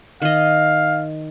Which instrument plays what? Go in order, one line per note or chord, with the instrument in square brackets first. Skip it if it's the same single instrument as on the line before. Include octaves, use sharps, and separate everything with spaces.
[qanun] D#3 D#5 [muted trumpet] F5